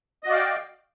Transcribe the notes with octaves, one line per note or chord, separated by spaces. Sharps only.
F#4 D5 D#5 F5 G5